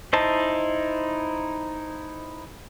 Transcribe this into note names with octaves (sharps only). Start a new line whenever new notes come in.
D#4 E4 C5 D#5 A5